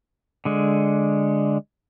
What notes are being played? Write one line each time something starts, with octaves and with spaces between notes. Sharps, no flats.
D3 G#3